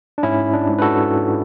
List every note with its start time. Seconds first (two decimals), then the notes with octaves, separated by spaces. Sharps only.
0.18 D4
0.23 G#2 C#4 E4
0.53 D4
0.68 G#2
0.79 B4
0.82 F#4 A4